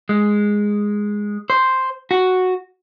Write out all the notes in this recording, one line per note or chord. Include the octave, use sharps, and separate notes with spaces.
G#3
C5
F#4